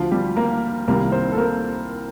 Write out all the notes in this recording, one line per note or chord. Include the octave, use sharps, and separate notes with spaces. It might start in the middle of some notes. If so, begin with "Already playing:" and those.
Already playing: D2 D3 F3 F4
G3 G4
A#3 A#4
C2 C3 D#3 G3 A#3 A#4
C4 C5
A4
A#3 A#4